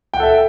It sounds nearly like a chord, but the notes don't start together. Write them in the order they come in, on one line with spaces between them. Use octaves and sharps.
G5 F#5 A4 E5